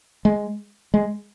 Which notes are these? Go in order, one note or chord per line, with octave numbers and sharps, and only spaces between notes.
G#3
G#3